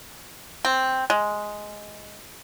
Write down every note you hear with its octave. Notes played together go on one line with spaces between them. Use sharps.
C4
G#3